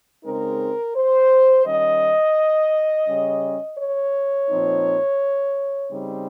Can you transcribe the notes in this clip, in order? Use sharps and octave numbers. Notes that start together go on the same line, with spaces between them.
C#3 G#3 C4 D#4 A#4
C5
D#3 G3 C#4 D#5
C#3 G3 C#4
C#5
A#2 F3 C4 D#4
C#3 G3 C4 D#4